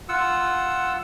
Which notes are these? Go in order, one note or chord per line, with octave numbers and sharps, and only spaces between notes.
F4 F#5 E6